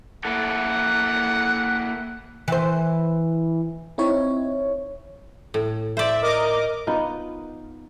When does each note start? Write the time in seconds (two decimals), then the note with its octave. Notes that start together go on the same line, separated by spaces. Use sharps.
0.25 A#3 E4 A4 F#5
2.48 E3 C5
3.98 C4 D#4 E4 C#5
5.54 A2
5.97 C5 D5 E5
6.22 A#4 D#5 D6
6.87 B3 D#4 F4